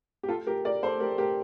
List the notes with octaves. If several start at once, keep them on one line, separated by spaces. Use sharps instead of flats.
G4
F4 A4
G4 A#4
A#4 D5
A4 C5
G4 A#4
G4 A#4